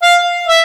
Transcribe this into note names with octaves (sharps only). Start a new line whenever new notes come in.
F5
E5